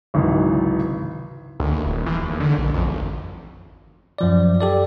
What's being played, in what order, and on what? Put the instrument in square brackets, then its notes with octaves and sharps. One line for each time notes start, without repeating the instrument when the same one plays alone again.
[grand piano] G#1 C#2 G#2 C3 E3 F#3
[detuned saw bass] D2
D#2
D#1
E3
D#2
D3
A#1
F2
G#1
[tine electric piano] F#2 F3 D5
G4 A4 D5